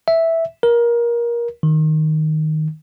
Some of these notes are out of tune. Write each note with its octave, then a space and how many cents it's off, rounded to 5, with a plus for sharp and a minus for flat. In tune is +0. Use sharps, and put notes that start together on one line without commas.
E5 -5
A#4 +20
D#3 -5